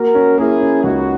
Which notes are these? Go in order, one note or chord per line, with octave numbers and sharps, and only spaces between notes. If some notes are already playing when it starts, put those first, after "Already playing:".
Already playing: A#3 F#4 A#4
C#4
A#3 E4 G#4
C#4
C#2 D#4 F#4